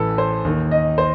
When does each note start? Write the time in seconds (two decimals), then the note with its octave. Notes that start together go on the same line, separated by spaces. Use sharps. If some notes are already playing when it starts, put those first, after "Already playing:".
Already playing: A1 A2 E3 A4 B4
0.18 C5
0.45 D#2 D#3
0.71 D#5
0.98 C5